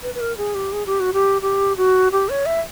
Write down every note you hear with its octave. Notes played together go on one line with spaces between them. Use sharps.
B4
B4
A#4
G#4
G4
G#4
G4
F#4
G4
G4
F#4
G4
C#5
E5